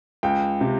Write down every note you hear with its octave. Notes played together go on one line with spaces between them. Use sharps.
C#2 G5
C3